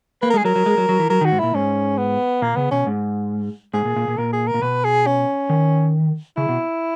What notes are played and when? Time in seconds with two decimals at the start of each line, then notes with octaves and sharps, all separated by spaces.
0.22 A#3 B4
0.30 A#4
0.34 G#3
0.37 G#4
0.45 F#3 A#4
0.56 F#3
0.66 G#3
0.77 F#3
0.89 F#3
0.99 E3
1.10 F#3 A#4
1.21 D#3
1.25 F#4
1.32 G#2
1.39 A#2 E4
1.55 G#2 C#4
1.98 B3
2.42 A#2 A#3
2.56 C#3 B3
2.71 B2 C#4
2.87 G#2
3.74 G#2 G#4
3.85 A#2
3.96 A#2
4.08 A#2
4.18 A#2 A#4
4.33 G#4
4.47 A#4
4.54 A#2
4.62 B2 B4
4.85 G#4
5.06 C#4
5.50 D#3
6.37 C#3 E4
6.49 B2